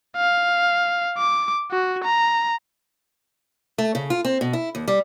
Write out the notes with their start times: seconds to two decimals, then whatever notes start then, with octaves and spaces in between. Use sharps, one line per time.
0.17 F5
1.17 D6
1.71 F#4
2.04 A#5
3.78 A3
3.95 C#3
4.10 F4
4.25 C4
4.41 B2
4.53 E4
4.75 D#2
4.88 G3